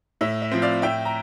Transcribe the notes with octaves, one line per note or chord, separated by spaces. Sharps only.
A2 E5
E5
F3 C4
D5 F5
A2 E5 G5
A#5